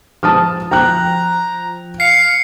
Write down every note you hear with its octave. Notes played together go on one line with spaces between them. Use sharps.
F3 A5 D#6 F6
F3 G5 A#5 F#6
F5 C7 C#7